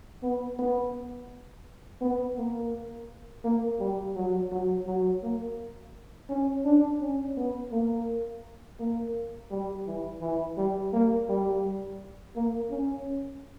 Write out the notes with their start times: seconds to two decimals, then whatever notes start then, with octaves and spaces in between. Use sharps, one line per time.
0.23 B3
0.59 B3
2.02 B3
2.37 A#3
3.44 A#3
3.80 G3
4.16 F#3
4.52 F#3
4.87 F#3
5.23 A#3
6.29 C#4
6.65 D4
7.01 C#4
7.37 B3
7.72 A#3
8.80 A#3
9.51 G3
9.87 E3
10.22 E3
10.58 G3
10.93 A#3
11.29 G3
12.36 A#3
12.71 C#4